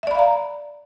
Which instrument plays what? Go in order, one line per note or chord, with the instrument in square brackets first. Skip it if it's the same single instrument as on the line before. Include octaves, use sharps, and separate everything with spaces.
[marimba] E5
D5
B5
F5
A#5